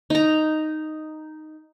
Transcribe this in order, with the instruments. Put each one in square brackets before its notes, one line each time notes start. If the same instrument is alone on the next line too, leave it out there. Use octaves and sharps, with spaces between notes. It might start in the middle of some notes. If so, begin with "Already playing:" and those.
[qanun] D#4 A#5